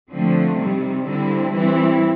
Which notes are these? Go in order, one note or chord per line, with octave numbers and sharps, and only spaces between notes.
D3 F3 A3 C4
C3 D#3 G3
D3 G3 C4 E4
E3 G3 C4 E4